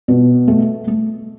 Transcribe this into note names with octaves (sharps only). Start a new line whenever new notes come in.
B2
A3
A3